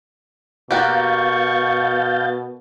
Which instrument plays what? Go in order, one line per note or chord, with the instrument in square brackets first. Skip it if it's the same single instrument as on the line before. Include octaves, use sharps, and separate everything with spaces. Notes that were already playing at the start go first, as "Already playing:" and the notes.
[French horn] B2 [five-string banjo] A#3 F#4 G4 [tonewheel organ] F5 G6 A6 [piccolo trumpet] C#6